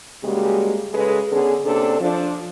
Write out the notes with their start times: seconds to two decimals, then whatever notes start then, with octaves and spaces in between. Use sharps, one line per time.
0.24 C#3 G3 G#3 A#3 F#4 G4
0.94 C#3 G#3 G#4 A4 B4
1.32 D3 B3 C#4 G#4
1.65 C3 A#3 C#4 D4 A4
2.01 F3 D4